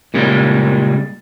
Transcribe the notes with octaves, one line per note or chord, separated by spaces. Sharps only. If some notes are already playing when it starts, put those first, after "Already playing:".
A#2 C#3 G3 G#3 A#3